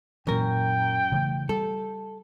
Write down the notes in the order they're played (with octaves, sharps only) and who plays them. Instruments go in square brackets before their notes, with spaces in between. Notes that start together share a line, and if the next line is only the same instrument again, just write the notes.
[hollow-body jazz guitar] F#2 A#4 [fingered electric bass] A#2 E3 [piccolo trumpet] G5
[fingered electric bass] C#3 E3 A3
[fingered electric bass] G3 [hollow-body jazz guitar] A4